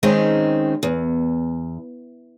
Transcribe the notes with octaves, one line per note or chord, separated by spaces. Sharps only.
D#3 G#3 C4 C#4 D#4
E2